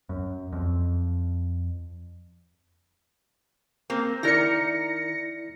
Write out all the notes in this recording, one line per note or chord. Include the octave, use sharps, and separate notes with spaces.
F#2
F2
A#3 C4
D#3 E4 A#4 D5 A#6 C#7